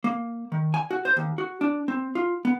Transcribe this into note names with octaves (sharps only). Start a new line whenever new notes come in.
A#3
D#3
G#5
F#4
C5
D#2
F#4
D4
C4
F4
B3